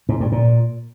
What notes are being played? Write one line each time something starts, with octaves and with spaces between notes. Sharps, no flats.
G#2
G2
A#2